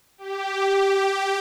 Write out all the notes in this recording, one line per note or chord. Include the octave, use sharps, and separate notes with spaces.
G4